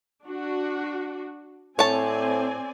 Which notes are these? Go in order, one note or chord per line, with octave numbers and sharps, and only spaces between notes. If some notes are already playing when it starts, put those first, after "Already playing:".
D4 F#4
A2 C4 C#5 D5 G#5 A5